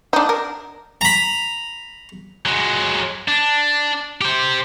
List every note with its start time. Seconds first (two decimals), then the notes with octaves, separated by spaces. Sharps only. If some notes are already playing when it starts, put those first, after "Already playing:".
0.13 D4 D#4
0.29 A#4
1.01 A#5 B5
2.46 F#3 G#3
3.28 D4
4.21 G4 C5